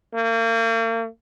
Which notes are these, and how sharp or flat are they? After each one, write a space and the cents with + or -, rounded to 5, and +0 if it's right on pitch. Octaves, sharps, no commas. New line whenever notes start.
A#3 -40